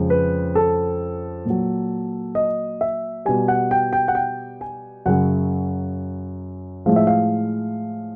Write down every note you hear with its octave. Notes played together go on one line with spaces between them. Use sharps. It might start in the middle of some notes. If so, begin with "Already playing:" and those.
Already playing: F2 C#3 F3 G#3
B4
A4
A#2 F#3
D#5
E5
B2 G3 G#5
F#5
G5
G5
F#5
G5
G#5
F#2 C#3 F#3 F#5
A2 F3 G#3 F5
E5
F5